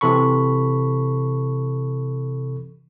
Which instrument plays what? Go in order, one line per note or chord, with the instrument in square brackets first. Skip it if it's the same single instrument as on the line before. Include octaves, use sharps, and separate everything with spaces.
[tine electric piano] C3 E3 A4 B5 C#6